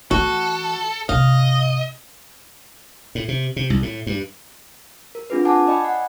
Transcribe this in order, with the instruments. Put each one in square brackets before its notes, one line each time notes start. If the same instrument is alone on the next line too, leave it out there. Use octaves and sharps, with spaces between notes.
[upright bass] E3 A3 [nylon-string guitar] F#4 [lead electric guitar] A4
[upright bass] G#2 C3 [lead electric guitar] D#5 [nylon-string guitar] F5
[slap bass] A2
C3
C3
C2
A2
G2
[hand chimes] A#4
C4 D4 F4 G#4 B4
F#5 G#5 A5 D6
D5 D#5 G5 G#5 B5
F#5